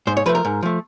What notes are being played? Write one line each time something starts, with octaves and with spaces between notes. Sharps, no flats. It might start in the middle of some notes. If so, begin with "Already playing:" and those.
G#2 C5
C#5
F3 A3 B4
A#4
G#2
F3 A3